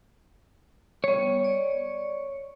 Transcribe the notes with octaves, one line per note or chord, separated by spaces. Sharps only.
G3 B3 C#5
D5